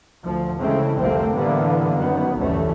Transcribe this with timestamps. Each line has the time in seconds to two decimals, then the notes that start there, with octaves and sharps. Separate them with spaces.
0.23 D2 F3
0.60 C#3 E3 G#3 A3 C4
0.98 F1 C2 D3 A3 A#3 C4
1.36 A2 D3 E3 G3 A#3 B3
1.96 F#2 D#3 B3
2.36 F1 D2 G2 E3 A3 C#4